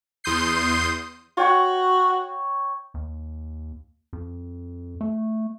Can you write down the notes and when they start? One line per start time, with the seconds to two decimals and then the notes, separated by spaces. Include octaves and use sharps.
0.24 E2 C6 D#6 G6 C7
1.37 F#4 C#5 G5 C#6
2.94 D#2
4.13 F2
5.01 A3